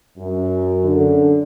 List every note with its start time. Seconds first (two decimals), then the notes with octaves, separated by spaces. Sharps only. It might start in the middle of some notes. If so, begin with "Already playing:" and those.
0.18 F#2
0.83 D3